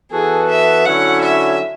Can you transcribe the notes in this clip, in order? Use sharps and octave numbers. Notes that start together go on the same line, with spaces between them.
E3 B3 F#4 G#4 A4
E5
D3 F#3 C#4 E4 F#5
E5